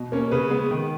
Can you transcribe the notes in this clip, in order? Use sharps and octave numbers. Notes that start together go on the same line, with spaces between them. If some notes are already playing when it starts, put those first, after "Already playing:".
Already playing: B2
A#3 C#4
C#3 B4
G#3 B3
D#3